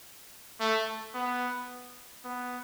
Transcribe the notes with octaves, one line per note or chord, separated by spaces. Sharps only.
A3
B3
B3